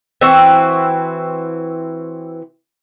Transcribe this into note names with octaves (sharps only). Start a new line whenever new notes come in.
E3 C4 E4 F#4